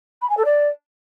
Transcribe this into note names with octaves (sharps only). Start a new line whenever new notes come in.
B5
G#5
A4
D5